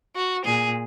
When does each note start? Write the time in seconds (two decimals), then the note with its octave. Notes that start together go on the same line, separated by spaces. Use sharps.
0.16 F#4
0.45 A#2 G#4